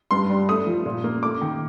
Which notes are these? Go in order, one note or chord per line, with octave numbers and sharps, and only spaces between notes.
G2 C6
G3
A3 D#6
F3
A#2
A#3
A3 D6
D#3